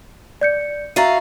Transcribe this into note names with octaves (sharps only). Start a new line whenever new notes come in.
D5 G6 C#7
F#4 E5 F5 A#5 A6 D#7